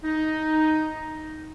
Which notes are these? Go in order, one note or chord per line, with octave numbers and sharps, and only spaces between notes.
D#4